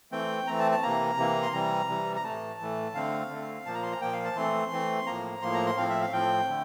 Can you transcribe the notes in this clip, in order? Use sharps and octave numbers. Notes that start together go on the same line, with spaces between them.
E3 A3 C4 G5
E3 A3 C4 A#5
A5
A5
C3 E3 A#3 A#5
C3 E3 A#3
C6
C3 E3 G3 A#5
C3 E3 G3
A#5
A2 E3 A3 A5
A2 E3 A3
D3 A3 C4 F5
D3 A3 C4
A#2 F3 A#3 A5
A#5
C6
A#5
A#2 F3 A#3 G5
F5
A5
E3 A3 C4 C6
E3 A3 C4
A2 F3 A#3 A#5
A2 F3 A#3 C6
A#5
C6
A2 F3 C4 F5
E5
F5
A2 F3 C4 G5
D3 A3